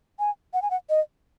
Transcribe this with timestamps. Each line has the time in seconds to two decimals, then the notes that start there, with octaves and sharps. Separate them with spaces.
0.19 G#5
0.54 F#5
0.62 G#5
0.71 F#5
0.90 D#5